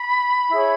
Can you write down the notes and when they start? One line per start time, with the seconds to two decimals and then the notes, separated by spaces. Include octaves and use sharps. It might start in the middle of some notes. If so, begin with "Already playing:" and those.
Already playing: B5
0.49 E4 G#4 C#5